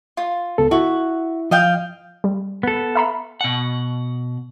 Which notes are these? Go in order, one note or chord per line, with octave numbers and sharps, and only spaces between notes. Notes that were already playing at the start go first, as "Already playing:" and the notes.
F4
C#2 B3 A4
E4 F#4 E5
F3 D#5 F5 G5
G3
B3 A4
E5 A#5 B5
B2 F#5